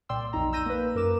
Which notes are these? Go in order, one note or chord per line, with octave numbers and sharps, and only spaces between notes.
C2 A#2 D5 G5 C6 E6
B1 F2 D#4 A#5
E6 G6 A#6 D#7
A#3 B4
F#2 A#4 D6 E7